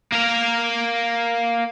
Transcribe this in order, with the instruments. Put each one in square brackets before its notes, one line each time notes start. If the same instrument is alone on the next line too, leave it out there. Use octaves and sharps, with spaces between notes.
[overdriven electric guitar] A#3 A#4